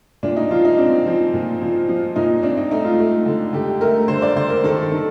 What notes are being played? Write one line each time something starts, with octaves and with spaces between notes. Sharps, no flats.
A#2 D4
D#4
F3 F4
D#4
C4 D4
F3
A#2
F3
F3
A#2 D#4
C4 D4
D#4
A3 D#4
F4
A3
D3
D3 G4
A3 A#4
D3 C5
D5
D3 C5
A#4
D#3 A4
A4
D#3